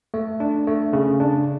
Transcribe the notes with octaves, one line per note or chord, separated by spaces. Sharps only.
A3
D4
A3
C#3
D4